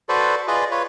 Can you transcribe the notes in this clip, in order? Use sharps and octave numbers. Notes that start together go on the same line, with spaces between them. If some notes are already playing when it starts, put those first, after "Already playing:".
F#4 A4 B4 C5 D5
F4 G#4 B4 D5 D#5
F4 B4 C#5